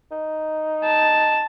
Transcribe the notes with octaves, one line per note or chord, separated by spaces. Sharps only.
D#4
A5